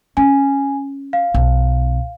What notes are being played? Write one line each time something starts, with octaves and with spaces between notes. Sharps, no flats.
C#4 G#5
F5
B1